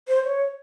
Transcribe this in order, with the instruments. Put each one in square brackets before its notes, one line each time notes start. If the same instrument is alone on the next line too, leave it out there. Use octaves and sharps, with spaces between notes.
[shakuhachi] C5
C#5